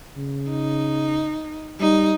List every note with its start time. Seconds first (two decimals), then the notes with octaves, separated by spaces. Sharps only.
0.17 C#3
0.49 D#4
1.80 G3 D#4